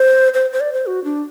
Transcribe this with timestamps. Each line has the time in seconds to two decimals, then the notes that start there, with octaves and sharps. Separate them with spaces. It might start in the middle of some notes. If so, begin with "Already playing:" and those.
Already playing: C5
0.34 C5
0.53 C5
0.60 D5
0.73 C5
0.87 F#4
1.04 D4